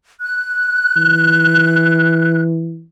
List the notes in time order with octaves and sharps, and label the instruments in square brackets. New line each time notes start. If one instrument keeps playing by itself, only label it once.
[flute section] F#6
[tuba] E3